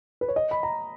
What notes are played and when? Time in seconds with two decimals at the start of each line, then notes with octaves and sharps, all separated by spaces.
0.21 B4
0.28 C#5
0.36 D#5
0.51 B5
0.63 A#5